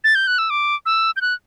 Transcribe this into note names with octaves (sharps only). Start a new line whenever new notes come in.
A6
G6
F#6
E6
D6
E6
G6
F#6